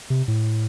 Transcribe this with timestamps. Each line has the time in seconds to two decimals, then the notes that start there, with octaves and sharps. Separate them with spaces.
0.10 C3
0.28 A2